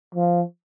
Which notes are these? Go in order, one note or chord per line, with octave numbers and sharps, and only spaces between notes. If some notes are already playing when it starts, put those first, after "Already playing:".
F3